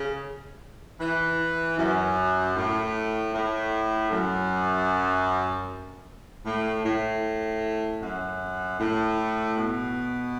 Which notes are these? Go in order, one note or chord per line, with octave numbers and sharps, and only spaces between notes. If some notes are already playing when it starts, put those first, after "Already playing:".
Already playing: C#3
E3
F#2
A2
A2
F#2
A2
A2
F#2
A2
B2